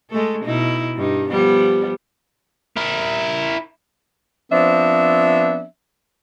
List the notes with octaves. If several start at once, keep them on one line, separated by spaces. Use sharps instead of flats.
G#3 A3 A4
B2 D#4 E4
G2 D#4
F3 G3 B3
E4 A#4
F3 B3 C4 D4 E5